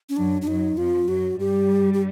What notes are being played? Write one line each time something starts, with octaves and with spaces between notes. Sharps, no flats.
C#4
F#2 F#3 D4
D4
F#2 F#3 D#4
F2 F3 F4
F#2 F#3 F#4
G2 G3 G4
G4